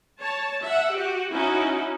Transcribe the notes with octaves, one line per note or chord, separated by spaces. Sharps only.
C#5 A5
E5 F#5
F#4 G4
C#4 D#4 E4 F#4